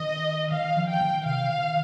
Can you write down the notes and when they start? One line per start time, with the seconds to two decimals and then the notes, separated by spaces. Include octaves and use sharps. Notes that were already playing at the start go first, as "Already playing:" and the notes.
Already playing: D#3 D#5
0.52 D#3 F5
0.77 F3
0.89 G5
1.01 D#3
1.25 C3 F5
1.50 D#3